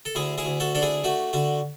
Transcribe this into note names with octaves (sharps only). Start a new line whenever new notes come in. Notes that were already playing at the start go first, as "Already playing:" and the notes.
A4
D2 E4 G#4
E4 G#4
D2
F#4 A4
D4 A4
E4 G#4
A3 F#4
D3 F#4